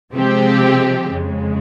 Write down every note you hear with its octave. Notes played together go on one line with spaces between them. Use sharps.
C3 F3 G#3 C4 G4
F2 C#3 G#3